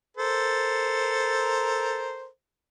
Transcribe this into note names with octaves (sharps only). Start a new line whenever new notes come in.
A4 A#4 C5